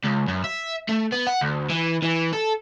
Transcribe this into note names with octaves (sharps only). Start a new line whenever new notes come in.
C#2
F#2
E5
A3
B3
F#5
D2
E3
E3
A4